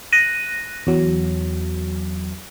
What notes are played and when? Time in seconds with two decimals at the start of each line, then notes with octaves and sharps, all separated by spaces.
0.13 F#6 A#6 D#7
0.87 E2 F#3